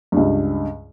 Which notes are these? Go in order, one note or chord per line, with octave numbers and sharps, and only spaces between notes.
C#2 G2